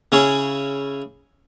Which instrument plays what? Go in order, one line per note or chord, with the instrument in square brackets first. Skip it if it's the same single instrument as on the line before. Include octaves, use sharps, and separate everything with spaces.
[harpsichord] C#3 C#4 E4 G#4 C#5